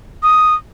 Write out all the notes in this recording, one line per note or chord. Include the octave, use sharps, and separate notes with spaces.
D#6